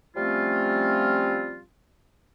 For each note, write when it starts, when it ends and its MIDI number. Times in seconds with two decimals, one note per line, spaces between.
0.16 1.61 53
0.16 1.61 55
0.16 1.61 57
0.16 1.61 60
0.16 1.61 61
0.16 1.61 65